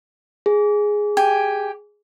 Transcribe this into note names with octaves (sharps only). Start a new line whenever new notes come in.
G#4
G4 G#5